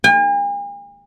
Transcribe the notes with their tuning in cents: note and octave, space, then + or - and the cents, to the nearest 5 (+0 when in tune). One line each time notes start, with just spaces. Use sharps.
G#5 -45